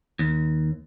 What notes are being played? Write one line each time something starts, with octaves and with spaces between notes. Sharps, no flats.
D#2